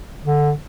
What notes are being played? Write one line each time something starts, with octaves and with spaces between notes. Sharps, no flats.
D3